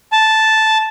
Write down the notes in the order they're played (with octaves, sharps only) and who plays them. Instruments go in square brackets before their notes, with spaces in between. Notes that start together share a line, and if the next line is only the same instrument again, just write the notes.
[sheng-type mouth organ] A5